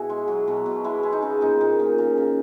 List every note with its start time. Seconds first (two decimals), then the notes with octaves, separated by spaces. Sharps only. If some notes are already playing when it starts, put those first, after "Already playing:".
Already playing: B2 E4 F#4 G#4
0.10 G#3
0.28 F#3
0.48 B2
0.66 B2
0.84 G#3 E4
1.03 G#3
1.13 D#4
1.22 C#3
1.41 A#2 D#4
1.61 A#2
1.79 A#2
1.98 C#3
2.17 C#3